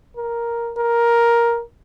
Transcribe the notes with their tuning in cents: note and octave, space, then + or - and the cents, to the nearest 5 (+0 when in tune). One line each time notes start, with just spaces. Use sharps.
A#4 +5
A#4 +10